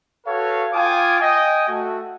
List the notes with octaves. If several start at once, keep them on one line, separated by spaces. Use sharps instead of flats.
F#4 A4 B4 C#5 F5
F4 F5 G5 G#5 D6 D#6
D#5 G5 G#5
A3 F#4